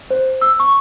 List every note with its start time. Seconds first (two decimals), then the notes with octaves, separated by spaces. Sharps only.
0.10 C5
0.42 E6
0.60 C#6